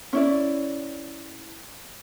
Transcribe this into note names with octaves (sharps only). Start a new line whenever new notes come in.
C#4 E4 D5